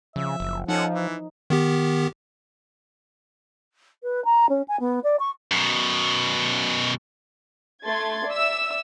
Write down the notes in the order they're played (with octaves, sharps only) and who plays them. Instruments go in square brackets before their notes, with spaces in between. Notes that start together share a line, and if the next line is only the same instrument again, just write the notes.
[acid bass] C#3 [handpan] F3 [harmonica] E5
[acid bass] F#1
[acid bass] F3 [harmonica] C#4 A4 F#5 [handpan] D#4
[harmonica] E3
[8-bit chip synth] D#3 B3 G4
[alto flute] B4
A#5
C#4
G#5
B3
D5
C#6
[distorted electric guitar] F#2 B2
[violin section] A3 C6 G#6 A6
D5 E5 E6